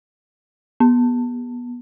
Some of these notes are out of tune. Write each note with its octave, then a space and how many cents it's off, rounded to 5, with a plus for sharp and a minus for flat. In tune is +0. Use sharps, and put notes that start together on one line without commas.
B3 -20